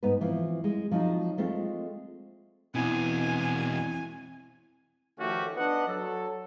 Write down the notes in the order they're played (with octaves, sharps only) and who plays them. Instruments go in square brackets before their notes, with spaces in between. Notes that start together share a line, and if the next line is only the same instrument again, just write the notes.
[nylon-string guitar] G#2 B3 D#4 B4
E3 F3 C4
G#3
F3 F#3 C4 D#4
G#3 A3 C4 F4
[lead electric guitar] E2 B2 [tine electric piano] C4 E4 [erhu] G#5
[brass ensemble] D#3 F3 A3 C#4 F#4 G4
B3 D4 B4 D#5 F#5
F#3 A4